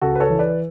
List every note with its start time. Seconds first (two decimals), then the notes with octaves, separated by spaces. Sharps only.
0.02 C#2 F#4 A4
0.15 B4
0.20 A4 C#5
0.30 E3
0.39 B4 D5